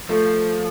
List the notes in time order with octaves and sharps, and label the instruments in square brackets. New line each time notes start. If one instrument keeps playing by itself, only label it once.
[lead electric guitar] F3 [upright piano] A3